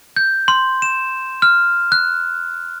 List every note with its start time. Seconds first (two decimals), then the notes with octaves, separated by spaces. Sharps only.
0.16 G6
0.48 C6
0.82 E7
1.42 F6
1.92 F#6